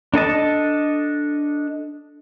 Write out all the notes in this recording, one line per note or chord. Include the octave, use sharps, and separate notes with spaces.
D4 A4 D#5 A5